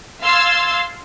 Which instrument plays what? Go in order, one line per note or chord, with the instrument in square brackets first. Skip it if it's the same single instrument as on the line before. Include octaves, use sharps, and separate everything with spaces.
[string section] F5 C6 E6 G#6 A6